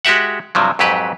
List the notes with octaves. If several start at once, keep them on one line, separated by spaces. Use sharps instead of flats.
G#3 F#4 G4 E5 F#5
G2 C3 F3 F#3
F2 G#2 F#3 G4 B4